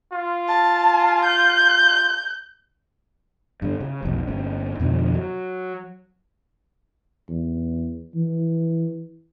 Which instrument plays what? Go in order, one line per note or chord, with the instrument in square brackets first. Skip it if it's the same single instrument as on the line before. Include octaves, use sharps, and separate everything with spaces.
[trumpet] F4
[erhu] A5
G6
[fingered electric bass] G2 D3
C#3
F1 B1
G1 C#4
F2 B2 D3 F3
F#3
[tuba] E2
E3